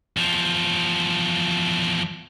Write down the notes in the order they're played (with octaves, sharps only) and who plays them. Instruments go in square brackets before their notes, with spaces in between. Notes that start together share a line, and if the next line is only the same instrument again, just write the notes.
[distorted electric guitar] E2 F3